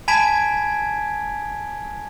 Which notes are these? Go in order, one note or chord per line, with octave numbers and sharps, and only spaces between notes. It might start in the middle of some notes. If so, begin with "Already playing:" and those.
G#5 A5 B5 G#6 B6 D7